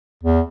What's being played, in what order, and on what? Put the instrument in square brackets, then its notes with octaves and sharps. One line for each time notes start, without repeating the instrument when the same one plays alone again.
[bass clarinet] E2